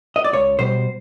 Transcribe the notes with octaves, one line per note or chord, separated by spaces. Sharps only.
D#5
D5
C#2 C#5
B2 G3 C5